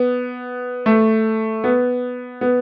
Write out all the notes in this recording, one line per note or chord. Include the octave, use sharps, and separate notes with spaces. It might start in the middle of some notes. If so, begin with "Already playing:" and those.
Already playing: B3
A3
B3
B3